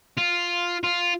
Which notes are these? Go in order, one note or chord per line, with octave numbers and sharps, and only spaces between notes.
F4
F4